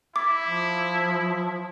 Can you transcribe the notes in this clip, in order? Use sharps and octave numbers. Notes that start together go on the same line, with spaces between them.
E4 D6
F3